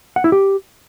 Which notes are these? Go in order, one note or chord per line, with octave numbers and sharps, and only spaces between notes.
F#5
E4
G4